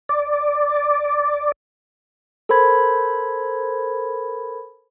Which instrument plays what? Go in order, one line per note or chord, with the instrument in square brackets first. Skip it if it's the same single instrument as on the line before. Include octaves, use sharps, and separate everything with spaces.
[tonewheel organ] D5
[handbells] A4 A#4 C5 B5 G#6